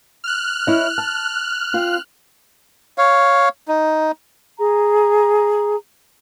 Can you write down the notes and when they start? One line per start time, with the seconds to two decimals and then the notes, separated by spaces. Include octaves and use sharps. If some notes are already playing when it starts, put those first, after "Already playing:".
0.24 F6 F#6
0.67 E4 C#5 D#5
0.98 A5
1.73 C4 F4 F5
2.98 C#5 F5
3.68 D#4
4.59 G#4 A#5